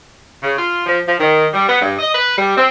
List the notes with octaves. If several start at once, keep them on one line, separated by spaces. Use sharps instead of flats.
C#3
F4
F3
F3
D#3
G3
B3
G2
D#5
B4
G3
C4